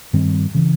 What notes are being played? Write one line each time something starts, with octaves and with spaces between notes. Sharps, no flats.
G2 D#3 G3 C4
C#3 E3